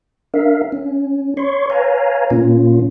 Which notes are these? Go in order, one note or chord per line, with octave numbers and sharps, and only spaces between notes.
D4 A#4 E5 F5
C#4
C#5 C6 C#6
B4 C#5 F5 G#5 A#5
A#2 A#3 C#4 F4